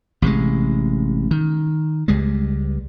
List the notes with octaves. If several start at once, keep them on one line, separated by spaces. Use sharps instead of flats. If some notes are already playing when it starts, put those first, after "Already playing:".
A1 C3 D#3 G#3
D#3
C#2 G3 G#3